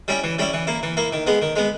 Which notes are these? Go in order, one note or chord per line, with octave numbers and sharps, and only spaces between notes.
G3 C#4 E4
E3
G3 C#4 E4
E3
A#3 E4
E3
A#3 E4
D#3
G#3 B3
D#3
G#3 B3